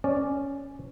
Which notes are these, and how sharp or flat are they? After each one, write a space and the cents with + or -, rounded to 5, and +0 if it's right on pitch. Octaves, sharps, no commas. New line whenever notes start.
C#4 +5 D5 +0